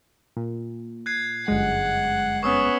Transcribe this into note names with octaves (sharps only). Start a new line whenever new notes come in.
A#2
F#6 G#6 C7
G1 F#2 G#3 F#5
B3 C#4 C#6 D#6 E6